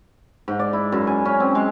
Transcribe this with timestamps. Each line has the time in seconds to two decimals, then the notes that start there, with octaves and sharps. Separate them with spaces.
0.48 G#2
0.59 D5
0.73 E4
0.92 F#2
1.07 G#5
1.25 C#4
1.40 C4
1.55 G#3